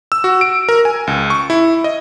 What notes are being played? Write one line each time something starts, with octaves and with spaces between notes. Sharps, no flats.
E6
F#4
D7
A#4
G#5
C#2
C#6
E4
D#5